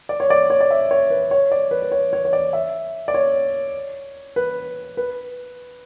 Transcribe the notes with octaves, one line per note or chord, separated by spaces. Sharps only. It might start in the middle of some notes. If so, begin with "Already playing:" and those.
D5
C#5
D5
C#5
D5
E5
C#5
B4
C#5
D5
B4
B4
C#5
C#5
C#5
D5
E5
D5
C#5
B4
B4